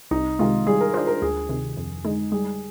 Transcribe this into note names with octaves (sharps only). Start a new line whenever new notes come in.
C2 D#4
C3 D#3 G#3 F4
G3 G#4
A#4
D4 F4 C5
A#4
D2 G#4
C3 D#3
F2
D3 G#3 D#4
G3 G#4